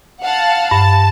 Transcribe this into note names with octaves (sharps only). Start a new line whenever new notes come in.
F5 F#5 A5
G2 A5